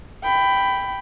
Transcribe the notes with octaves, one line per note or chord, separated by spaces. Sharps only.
G5 B5